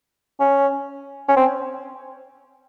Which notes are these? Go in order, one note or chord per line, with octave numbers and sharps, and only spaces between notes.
C#4
C#4
C4